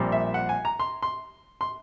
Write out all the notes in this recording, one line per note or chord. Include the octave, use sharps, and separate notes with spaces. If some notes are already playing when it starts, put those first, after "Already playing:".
Already playing: A#1 A#2 G3 C4
E5
F#5
G#5
A#5
C6
C6
C6